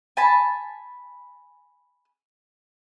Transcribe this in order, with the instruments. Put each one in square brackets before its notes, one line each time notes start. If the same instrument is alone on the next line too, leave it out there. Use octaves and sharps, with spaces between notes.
[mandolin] G#5 A5 B5